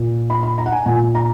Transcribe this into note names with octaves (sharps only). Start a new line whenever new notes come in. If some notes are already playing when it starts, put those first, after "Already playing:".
Already playing: A#2
B5
B5
A#5
F#5
G#5
A#2 G#5
A#5